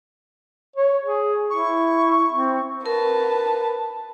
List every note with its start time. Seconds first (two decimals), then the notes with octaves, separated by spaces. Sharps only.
0.76 C#5
1.05 G#4
1.50 E4 C#6
2.33 C4
2.86 A#4 B4 A5